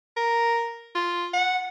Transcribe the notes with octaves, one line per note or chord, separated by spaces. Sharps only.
A#4
F4
F#5